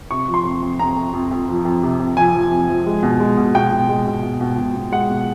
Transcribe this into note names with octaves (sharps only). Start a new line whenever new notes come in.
C3 C#6
F3
C6
F2
F2
F2 A#5
F2
F2
F2
F3
F2
C3
F2
F3 G#5
F3
F2
F3
G#3
B2
G#3
B2
B2 G5
B2
G#3
B2
B2
B2
B2
B2
G#3 F#5
B2